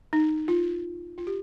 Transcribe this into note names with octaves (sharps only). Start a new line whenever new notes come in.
D#4
F4
F4
G4